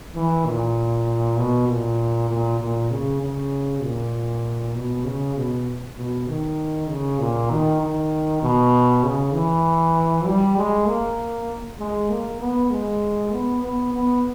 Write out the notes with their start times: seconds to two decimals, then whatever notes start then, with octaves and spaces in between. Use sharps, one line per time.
0.15 E3
0.45 A#2
1.37 B2
1.68 A#2
2.30 A#2
2.60 A#2
2.91 C#3
3.21 C#3
3.83 A#2
4.74 B2
5.05 C#3
5.36 B2
5.97 B2
6.28 D#3
6.89 C#3
7.19 A#2
7.50 D#3
7.81 D#3
8.42 B2
9.03 C#3
9.34 E3
10.26 G3
10.57 G#3
10.87 A#3
11.79 G#3
12.10 A#3
12.40 B3
12.71 G#3
13.32 B3
13.63 B3
13.94 B3